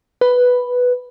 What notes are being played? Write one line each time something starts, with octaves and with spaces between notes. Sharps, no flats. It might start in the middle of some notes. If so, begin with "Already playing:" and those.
B4